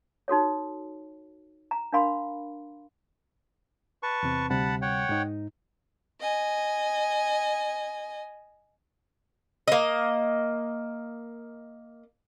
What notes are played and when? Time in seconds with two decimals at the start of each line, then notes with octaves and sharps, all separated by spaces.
0.28 D#4 F#4 A4 C#5
1.71 A#5
1.92 D4 A#4 F5 B5 C6
4.03 B4 A5 C#6
4.23 E2 C3 C4
4.50 D2 C3 G3 F#5 A5 B5
4.82 C#5 F#5 G5
5.09 G#2 D#4
6.21 D#5 G#5
9.68 A#3 D#5